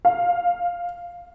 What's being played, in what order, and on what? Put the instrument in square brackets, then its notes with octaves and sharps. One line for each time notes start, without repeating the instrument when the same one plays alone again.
[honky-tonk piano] F5